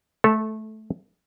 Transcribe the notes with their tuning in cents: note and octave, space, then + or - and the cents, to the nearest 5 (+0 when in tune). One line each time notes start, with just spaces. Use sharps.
A3 -15 A4 +0